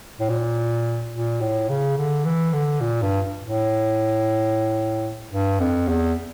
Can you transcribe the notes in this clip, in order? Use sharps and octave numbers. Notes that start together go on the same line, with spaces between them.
A2
A#2
A#2
A2
C#3
D3
E3
D3
A#2
G2
A2
G2
F2
E2